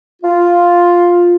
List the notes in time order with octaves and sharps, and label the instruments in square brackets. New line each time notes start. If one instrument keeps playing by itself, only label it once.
[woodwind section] F4